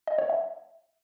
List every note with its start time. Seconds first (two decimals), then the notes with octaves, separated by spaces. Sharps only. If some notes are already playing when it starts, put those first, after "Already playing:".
0.07 D#5
0.18 C#5
0.29 E5